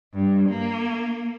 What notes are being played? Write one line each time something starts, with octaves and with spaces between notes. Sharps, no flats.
G2
A#3